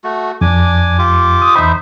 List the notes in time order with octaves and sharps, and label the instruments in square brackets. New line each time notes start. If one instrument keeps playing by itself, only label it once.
[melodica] A3 F#4
[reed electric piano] F2 [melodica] D4 G#5 D6
[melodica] F4 G4 D6
[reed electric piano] D#6
[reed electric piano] E2 B5 [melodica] D#4 C5 E5